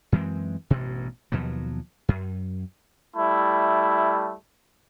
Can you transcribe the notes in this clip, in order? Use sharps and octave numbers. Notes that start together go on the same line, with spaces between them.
F#2 E3 G#3 C4
A1 G2 B2
D#2 B2 F3 F#3
F#2
G3 A3 E4